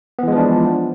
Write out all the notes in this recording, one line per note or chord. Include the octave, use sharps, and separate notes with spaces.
E3 F3 G#3 B3 D4